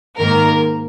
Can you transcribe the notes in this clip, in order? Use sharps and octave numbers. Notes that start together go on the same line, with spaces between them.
G#2 D#3 A#3 A#4